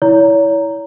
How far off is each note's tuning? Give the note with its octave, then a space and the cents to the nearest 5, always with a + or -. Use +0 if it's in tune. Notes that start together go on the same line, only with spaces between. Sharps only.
E4 -5 C#5 +35 A#5 -5